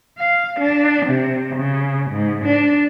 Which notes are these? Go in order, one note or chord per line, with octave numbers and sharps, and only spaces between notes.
F5
D4
C3
C#3
G#2
D4